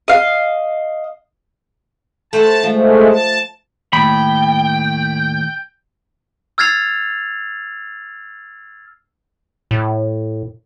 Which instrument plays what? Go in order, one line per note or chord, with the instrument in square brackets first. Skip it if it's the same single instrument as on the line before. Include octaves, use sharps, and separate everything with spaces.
[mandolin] D#5 F5
[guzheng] A3 C5 F#5 [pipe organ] A5
[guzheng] F3 [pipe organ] G#3 A3
[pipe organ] A5
[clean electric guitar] D#2 A2 [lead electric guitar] G5 [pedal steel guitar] B5
[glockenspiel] E6 F6 G#6 A6 C7 F7
[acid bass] A2